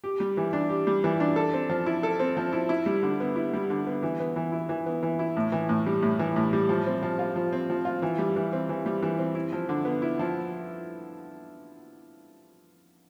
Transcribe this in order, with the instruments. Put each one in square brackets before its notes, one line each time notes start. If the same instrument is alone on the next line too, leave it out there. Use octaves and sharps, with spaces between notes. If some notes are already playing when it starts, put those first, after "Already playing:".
[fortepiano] G4
G3
E3
D4
G4
G3
E3
D4
A4
C4
F3
E4
A4
C4
F3
E4
E4
G3
D3
B3
E4
G3
D3
B3
E3
B3
E3
E4
E3
B3
E3
E4
A2
E3
A2
G3
A2
E3
A2
G3
F3
C4
F3
F4
F3
C4
F3
F4
E3
G3
E3
C4
E3
G3
E3
C4
E4
F3
D3
B3
E4
F3